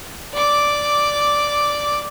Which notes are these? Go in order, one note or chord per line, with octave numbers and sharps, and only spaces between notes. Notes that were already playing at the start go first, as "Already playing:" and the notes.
D5 D6